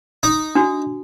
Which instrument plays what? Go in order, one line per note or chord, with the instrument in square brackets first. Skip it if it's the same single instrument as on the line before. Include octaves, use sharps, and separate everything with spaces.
[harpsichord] D#4
[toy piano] D4 F#4